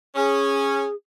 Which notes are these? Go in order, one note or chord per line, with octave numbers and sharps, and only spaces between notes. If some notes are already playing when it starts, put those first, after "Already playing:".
C#4 G#4